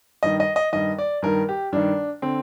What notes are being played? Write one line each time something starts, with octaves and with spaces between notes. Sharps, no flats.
G2 D#3 D#5
D#5
D#5
G2 D#3 D#5
D5
G2 D#3 A#4
G4
G2 D#3 D4
D3 C4